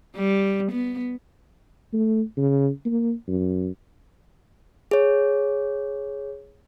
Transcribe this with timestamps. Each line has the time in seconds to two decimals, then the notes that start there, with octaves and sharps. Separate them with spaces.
0.16 G3
0.72 B3
1.93 A3
2.37 C#3
2.85 A#3
3.28 F#2
4.91 G#4 C#5